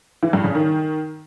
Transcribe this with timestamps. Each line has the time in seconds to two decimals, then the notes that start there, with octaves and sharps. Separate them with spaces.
0.23 E3
0.33 G2
0.44 C#3
0.55 D#3